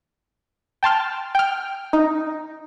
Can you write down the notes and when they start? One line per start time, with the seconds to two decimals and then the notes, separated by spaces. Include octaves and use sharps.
0.83 G5 A5 C6 F6
1.35 G5 F6
1.93 D#4